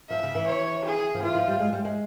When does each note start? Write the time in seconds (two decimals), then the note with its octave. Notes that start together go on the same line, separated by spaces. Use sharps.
0.09 F3 E5
0.23 C#3
0.35 E3
0.47 C#5
0.85 G#4
1.15 F3
1.23 E3 F4
1.35 F3
1.48 G3
1.60 G#3
1.73 G3
1.85 G#3